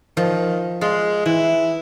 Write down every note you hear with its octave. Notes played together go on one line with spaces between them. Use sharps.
D#3 F3
G#3 F4
E3 E4